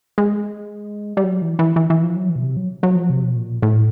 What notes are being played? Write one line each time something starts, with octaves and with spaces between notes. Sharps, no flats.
G#3
G3
F#3
E3
E3
E3
E3
F3
F#3
E3
B2
C3
F#3
F#3
F3
C3
B2
A#2
A2